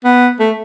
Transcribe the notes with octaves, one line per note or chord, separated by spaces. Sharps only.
B3
A3